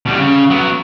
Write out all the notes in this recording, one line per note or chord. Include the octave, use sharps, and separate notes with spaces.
B2 G3
C#3
F#3 B3